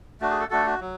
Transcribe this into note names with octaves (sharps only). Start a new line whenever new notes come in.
A3 D4 F#4
G#4
A4
A3 D4 F#4 A4
F#4
F#3